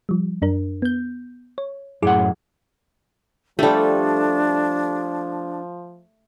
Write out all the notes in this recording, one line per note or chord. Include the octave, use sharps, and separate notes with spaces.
F3 G3
F#2 D4 A#4
B3 G6
C#5
F#2 A2 E4 G#4 F#5 D6
F3 G3 A3 D4 G4 A4